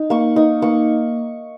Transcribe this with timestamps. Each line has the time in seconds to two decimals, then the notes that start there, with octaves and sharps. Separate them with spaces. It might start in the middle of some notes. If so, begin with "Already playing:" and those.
Already playing: D#4
0.10 A#3 C#6
0.36 D#4 D#6
0.62 A#3 C#6